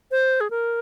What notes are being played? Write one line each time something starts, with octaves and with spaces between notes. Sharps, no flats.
C5
G#4
A#4